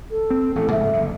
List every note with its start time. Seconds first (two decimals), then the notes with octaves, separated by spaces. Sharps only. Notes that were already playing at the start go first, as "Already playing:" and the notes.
0.11 A4
0.30 C4
0.55 A1 A3 A4
0.71 G#2 C#3 F3 E5
0.93 F#1 D3